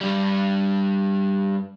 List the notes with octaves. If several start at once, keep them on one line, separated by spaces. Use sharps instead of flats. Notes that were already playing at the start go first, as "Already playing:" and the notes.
G2 G3